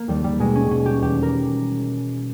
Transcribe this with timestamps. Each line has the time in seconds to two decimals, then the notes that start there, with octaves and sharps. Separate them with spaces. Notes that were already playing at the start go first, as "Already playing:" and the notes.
Already playing: A#3
0.08 D#2 G3
0.24 G3
0.39 B2 G#3
0.55 C#4
0.71 B2 C#4
0.86 G4
1.01 E2 G4
1.22 A#4